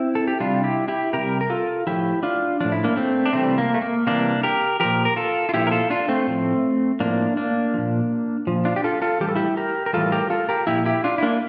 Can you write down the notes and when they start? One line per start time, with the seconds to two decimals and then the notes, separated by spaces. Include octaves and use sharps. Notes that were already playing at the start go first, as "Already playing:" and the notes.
Already playing: C4 E4
0.15 A4
0.28 G4
0.40 C3 G3 D4 F4
0.64 E4 G4
0.88 E4 G4
1.13 C3 G3 G4 A#4
1.41 A#4
1.50 F4 A4
1.87 A2 F3 E4 G4
2.23 D4 F4
2.60 A2 F3 D4
2.72 E4
2.84 A#3 D4
2.96 A3 C4
3.26 D4
3.33 C3 E3 G3 A3 C4
3.58 A#3
3.74 A3
3.82 A#3
4.07 C3 E3 G3 A#3 D4
4.43 G4 A#4
4.80 A#2 F3 G4 A#4
5.05 A#4
5.16 F4 A4
5.49 F4
5.54 A#2 F3 E4 G4
5.67 A#4
5.71 F4 A4
5.90 D4 F4
6.08 A3 C4
6.27 A2 F3
7.00 A2 F3 A#3 D4
7.37 A#3 D4
7.74 A#2 F3
8.47 A#2 F3
8.65 D4 F4
8.76 G4
8.84 F4 A4
9.02 F4 A4
9.20 A2 E3 G3 G4
9.29 A4
9.35 E4 G4
9.57 G4 A#4
9.86 A#4
9.93 A2 E3 G3 F4 A4
10.12 G4 A#4
10.30 F4 A4
10.49 G4 A#4
10.67 A#2 F3 E4 G4
10.85 E4 G4
11.04 D4 F4
11.18 E4
11.23 A#3 D4